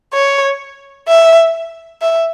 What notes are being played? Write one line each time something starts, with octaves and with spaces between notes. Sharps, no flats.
C#5
E5
E5